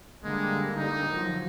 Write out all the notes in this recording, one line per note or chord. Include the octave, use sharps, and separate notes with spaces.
D3 G3 G#3 A#3
D#4
F3 F#3